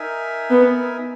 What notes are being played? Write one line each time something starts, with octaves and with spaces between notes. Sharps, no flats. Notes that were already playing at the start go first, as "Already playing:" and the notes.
Already playing: D#4 A#4 E5 G#5
B3